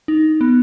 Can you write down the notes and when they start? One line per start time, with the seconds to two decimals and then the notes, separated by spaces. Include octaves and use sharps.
0.08 D#4
0.41 B3